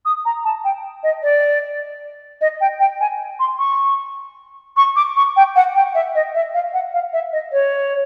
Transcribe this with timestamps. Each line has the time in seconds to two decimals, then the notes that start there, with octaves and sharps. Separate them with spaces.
0.05 D#6
0.25 A#5
0.45 A5
0.64 G5
1.03 D#5
1.23 D5
2.41 D#5
2.61 G5
2.80 G5
3.00 G#5
3.39 C6
3.59 C#6
4.77 C#6
4.96 D6
5.16 C#6
5.36 G5
5.56 F#5
5.75 G5
5.95 E5
6.15 D#5
6.35 E5
6.54 F5
6.74 F#5
6.93 F5
7.13 E5
7.33 D#5
7.52 C#5